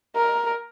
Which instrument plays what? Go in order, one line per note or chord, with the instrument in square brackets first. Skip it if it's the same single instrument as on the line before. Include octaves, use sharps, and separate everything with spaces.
[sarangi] A#4